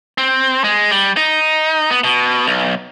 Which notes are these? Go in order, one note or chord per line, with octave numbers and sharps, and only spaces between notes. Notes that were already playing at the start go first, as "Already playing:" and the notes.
C4
G#3
G3
D#4
B3
B2
B1